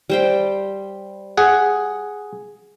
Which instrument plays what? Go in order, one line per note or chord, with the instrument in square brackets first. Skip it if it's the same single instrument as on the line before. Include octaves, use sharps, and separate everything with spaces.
[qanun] G3 C5 G5
[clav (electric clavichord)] G#4 F#5